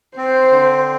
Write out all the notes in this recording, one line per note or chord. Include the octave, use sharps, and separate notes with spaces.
C4 C5
D3